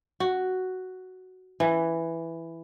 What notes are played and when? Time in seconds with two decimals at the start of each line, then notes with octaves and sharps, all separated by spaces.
0.20 F#4
1.60 E3